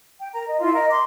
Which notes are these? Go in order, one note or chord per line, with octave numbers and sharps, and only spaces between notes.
G5
A#4 A#5
D#5
E4 F4 F5 C6
A#4 D#5
C6 D6